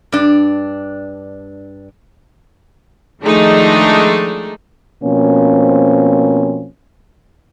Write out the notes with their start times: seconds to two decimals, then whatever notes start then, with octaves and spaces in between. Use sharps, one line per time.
0.12 G2 D4
3.21 D#3 F3 G#3 A3 D4 D#4
5.04 B2 F3 A#3 C4 C#4